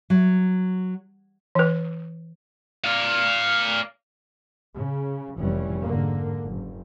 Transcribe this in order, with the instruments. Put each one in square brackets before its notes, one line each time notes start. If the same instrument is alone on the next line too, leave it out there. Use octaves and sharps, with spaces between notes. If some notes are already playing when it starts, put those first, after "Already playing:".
[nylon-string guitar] F#3
[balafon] E3 B4
[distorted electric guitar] D5 F5
[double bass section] C#3
F1 E3 G3 C#4
G#2 D3 A#3
F#1